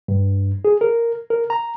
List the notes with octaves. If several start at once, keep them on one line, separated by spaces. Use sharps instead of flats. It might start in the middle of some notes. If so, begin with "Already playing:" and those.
G2
G#4
A#4
A#4
A#5